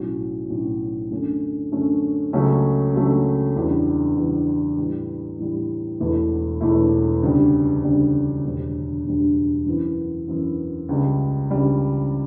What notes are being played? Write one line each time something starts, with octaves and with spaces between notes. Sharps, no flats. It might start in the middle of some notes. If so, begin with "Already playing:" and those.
Already playing: B1 A2 F#3 C#4 F#4
B1 A2 F#3 C#4 F#4
F#2 D3 A3 C#4
F#2 D3 A3 C#4
C#2 C#3 F#3 A3 C#4
C#2 C#3 F#3 A3 C#4
E2 C#3 G3 D4
E2 C#3 G3 D4
A2 E3 G3
A2 E3 G3
E1 E2 B2 A3 E4
E1 E2 B2 A3 E4
D2 C#3 G3
D2 C#3 G3
E1 D2 D3 G3
E1 D2 D3 G3
F#2 E3 B3
F#2 E3 B3
C#2 C#3 G3
C#2 C#3 G3